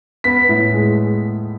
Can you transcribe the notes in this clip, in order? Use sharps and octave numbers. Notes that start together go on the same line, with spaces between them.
B3 B6
A2
G#3